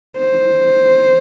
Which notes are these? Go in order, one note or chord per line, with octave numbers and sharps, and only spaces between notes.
C5